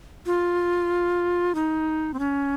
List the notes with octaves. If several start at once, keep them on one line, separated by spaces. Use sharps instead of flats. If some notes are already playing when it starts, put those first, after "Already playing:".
F4
D#4
C4
C#4